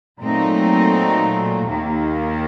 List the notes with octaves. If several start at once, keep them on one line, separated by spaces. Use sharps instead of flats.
A#2 F#3 A3 C4 D#4
D#2 D#3 A#3